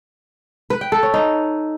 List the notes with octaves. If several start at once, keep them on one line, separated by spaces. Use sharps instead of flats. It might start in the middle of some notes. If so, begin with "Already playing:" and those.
B4
G5
A4
C#5
D#4